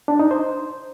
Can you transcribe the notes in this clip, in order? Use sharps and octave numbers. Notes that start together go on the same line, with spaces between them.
D4
D#4
C5